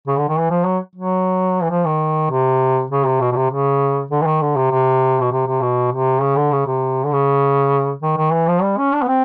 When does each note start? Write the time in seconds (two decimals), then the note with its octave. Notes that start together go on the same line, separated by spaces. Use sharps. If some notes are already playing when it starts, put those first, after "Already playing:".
0.08 C#3
0.18 D3
0.29 D#3
0.39 E3
0.50 F3
0.65 F#3
0.95 F#3
1.62 E3
1.70 F3
1.85 D#3
2.30 C3
2.91 C#3
3.06 C3
3.21 B2
3.32 B2
3.36 C3
3.51 C#3
4.11 D3
4.22 E3
4.26 D#3
4.41 D3
4.56 C3
4.71 C3
5.21 B2
5.32 C3
5.47 C3
5.61 B2
5.92 C3
6.22 C#3
6.37 D3
6.52 C#3
6.67 C3
7.05 D3
7.12 C#3
8.02 D#3
8.17 D#3
8.32 E3
8.48 F3
8.62 G3
8.78 C#4
8.93 D4
9.03 B3
9.08 C4